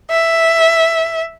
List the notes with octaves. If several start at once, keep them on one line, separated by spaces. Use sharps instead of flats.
E5